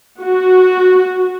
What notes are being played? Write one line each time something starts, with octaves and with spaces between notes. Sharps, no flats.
F#4